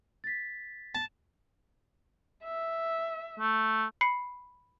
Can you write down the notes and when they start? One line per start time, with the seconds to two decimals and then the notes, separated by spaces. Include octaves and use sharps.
0.24 A6 B6
0.95 A5 E7
2.43 E5
3.39 A3
4.01 B5 C7 C#7